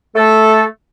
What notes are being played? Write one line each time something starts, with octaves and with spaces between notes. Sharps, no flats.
A3 A4